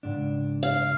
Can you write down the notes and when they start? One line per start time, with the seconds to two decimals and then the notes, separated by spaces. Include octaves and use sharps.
0.03 C#2 G#2 D4
0.63 F5